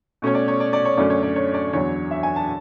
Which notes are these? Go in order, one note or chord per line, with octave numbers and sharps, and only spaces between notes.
B2 A3 C#4 C#5
D5
C#5
D5
D5
C#5
F#2 D3 A3 C#4 D5
C#5
D5
C#5
D5
E2 D3 F#3 C#5
E5
G#5
A5